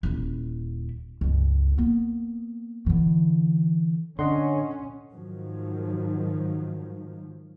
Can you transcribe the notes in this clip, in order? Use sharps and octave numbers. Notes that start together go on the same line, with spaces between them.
D#1 E4
C#2 G2
A#3 B3
D3 E3
D3 C#4 D#5 F#5 C6
G#2 D#3 F3 F#3